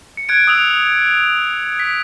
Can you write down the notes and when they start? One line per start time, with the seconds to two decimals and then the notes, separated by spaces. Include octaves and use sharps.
0.17 C#7
0.29 F#6 G#6 D7
0.47 D#6 E6 F7
1.79 B6